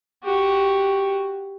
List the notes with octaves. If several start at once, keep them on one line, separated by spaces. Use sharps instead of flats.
F#4 G4